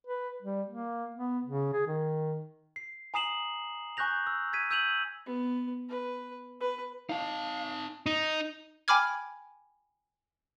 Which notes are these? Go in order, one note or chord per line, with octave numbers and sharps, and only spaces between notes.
B4
G3
A#3
B3
C#3
G#4
D#3
C7
G#5 A#5 D#6 C7 E7 F#7
G#5 C#6 F#6 G6 A#6 F7
E6
G#6 B6 D#7
E6 G6 D#7 F7 F#7
B3
B4
B4
D#4 F5 A5
D#4
G5 G#5 B5 D6 F6 G#6